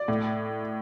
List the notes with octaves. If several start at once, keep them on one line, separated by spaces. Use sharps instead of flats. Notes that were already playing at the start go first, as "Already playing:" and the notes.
Already playing: D5
A2